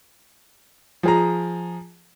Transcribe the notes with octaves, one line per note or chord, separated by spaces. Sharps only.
F3 G#4 A#5